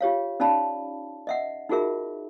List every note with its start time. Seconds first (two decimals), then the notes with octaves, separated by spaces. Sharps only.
0.01 F4 G4 C#5 F5
0.40 C#4 D#4 D5 F5 A5 B5
1.27 D#5 E5 F#5
1.69 D#4 F4 F#4 G#4 A#4 E5